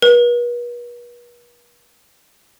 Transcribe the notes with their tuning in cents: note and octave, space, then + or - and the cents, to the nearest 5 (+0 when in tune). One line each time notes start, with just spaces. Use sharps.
B4 -45